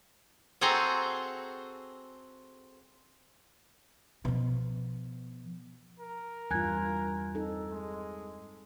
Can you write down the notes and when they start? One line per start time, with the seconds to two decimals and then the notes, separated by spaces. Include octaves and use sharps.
0.61 C4 F#4 G#4 A4 A#5 C6
4.25 B2 F3
6.00 A#4
6.51 E2 G2 G3 F4 G#5 F#6 G#6
7.35 C4 D#4 A4
7.70 G#3